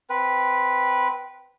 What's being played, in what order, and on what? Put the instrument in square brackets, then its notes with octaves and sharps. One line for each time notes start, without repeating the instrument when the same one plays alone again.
[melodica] C4 B4